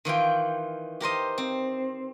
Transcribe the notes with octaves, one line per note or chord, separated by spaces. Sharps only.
D#3 E3 F4 G5
G4 A#4 C5 D#5
C4